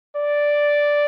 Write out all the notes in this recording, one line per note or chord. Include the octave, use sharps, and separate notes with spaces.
D5